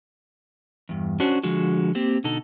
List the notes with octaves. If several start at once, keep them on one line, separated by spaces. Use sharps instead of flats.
E2 G2
C#4 D4 F#4 C5
D3 F3 G#3 F#4
A#3 C4 G4
B2 D3 D#4 A4